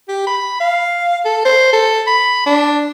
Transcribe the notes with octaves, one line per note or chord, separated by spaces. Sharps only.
G4
B5
F5
A4
C5
A4
B5
D4